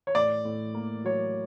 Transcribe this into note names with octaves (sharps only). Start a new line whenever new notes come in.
C#5
A2 D5
A2
A#3
F#3 C#5